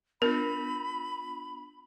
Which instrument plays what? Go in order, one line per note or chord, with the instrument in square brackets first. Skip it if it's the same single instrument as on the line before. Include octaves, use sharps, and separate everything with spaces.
[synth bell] B3 D4 F4 [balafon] A#4 [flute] B5